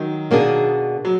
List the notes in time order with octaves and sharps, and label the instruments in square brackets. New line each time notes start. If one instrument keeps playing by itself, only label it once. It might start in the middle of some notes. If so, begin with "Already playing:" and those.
Already playing: [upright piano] D#3 F#3
[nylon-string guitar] B2 A#3 D4 G#4
[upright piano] F#3